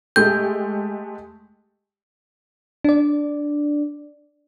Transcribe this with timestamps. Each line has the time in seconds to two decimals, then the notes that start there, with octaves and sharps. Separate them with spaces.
0.16 G#3 A3 G4 G6
2.84 D4 D5